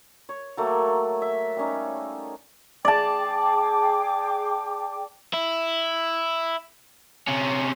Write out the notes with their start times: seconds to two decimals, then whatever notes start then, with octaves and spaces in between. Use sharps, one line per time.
0.29 C#5
0.57 F#3 A3 A#3
1.22 E5
1.57 G3 C#4 D#4
2.85 G#4 D5 G5 A5 D6
5.33 E4
7.27 C3 C#4